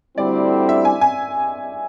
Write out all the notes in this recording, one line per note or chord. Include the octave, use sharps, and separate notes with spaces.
D2 D3 G3 C4 E4 D5
E5
G#5
G#5